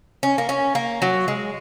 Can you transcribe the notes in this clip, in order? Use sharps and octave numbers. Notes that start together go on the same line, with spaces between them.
C#4
A#3
C#4
A#3
F#3
G#3